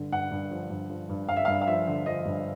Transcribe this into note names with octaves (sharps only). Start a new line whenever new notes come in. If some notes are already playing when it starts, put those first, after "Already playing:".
Already playing: G2 D3
G2 F#5
G2
F3
G2
F3
G2
G2 F5
E5
F5
G2
F5
F3 E5
D3
F3 D#5
G2